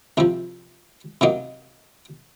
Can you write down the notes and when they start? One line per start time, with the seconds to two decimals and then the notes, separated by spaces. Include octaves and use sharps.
0.17 C2 C3 F3
1.21 C3 F#3 A#3 D#4